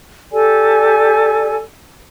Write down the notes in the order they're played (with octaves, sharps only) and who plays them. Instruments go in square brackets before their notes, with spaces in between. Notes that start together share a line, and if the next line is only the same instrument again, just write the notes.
[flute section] G4 A4 D5 G#5